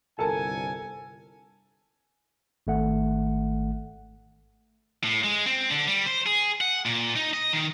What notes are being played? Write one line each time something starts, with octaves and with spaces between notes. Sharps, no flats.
G1 C2 A4 A#4 G#5 A5
G#1 A3 F#5
A2
G#3
C4
D3
G3
C5
G#4
F#5
A#2
D#4
D#5
D#3